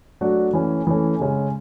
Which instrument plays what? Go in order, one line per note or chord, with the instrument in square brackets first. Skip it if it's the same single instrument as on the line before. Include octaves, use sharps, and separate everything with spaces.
[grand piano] F#3 A3 D4 F#4
E3 A3 C#4
E3 A3 C#4
C#3 G#3 C#4